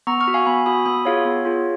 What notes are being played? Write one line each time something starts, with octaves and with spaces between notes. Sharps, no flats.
B3 A#5 C#6
C#6 F6
F#4
F5 G#5
B3 G#5 B5
F#4 B5 D#6
B3 B5 D#6
F4 G#4 C#5 F5
B3
F4 G#4